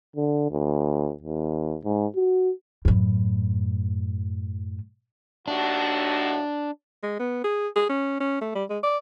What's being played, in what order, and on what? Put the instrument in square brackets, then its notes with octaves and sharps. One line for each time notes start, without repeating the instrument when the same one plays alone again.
[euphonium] D3
D2
D#2
G#2
F#4
[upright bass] F#2 A2
[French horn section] D#2 A2 F#4 [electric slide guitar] D4
[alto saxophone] G#3
B3
G#4
G#4
C#4
C#4
A3
G3
G#3
D5